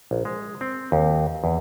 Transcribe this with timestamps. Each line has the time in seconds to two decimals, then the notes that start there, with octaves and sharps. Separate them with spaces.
0.11 A#1
0.25 G#3
0.61 C4
0.92 D#2
1.44 E2